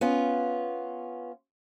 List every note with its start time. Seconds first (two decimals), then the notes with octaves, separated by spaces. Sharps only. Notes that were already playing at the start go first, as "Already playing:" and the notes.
0.01 B3 C#4 F4